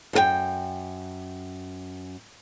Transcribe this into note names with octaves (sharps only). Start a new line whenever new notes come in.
F#2 A#4 G5